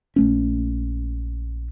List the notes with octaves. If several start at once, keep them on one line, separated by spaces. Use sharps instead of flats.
A#1 A3 C#4